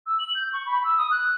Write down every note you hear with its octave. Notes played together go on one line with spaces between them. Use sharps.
E6
F#7
G6
C#6
B5
E6
D#6
F#6